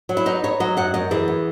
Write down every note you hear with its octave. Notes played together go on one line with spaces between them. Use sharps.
F#3
E4
B3 D#4
D#4 C#5
F#3 D#5
F#2 F#5
F#2 D#5
E3 G#4
B3